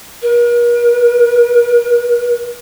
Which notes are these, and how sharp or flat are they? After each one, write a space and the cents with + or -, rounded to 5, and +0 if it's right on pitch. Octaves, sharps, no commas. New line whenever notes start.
A#4 +40